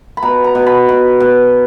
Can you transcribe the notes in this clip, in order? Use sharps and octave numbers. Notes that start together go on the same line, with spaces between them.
B5
B2 A#5
A#5
B2
B5
B2
B2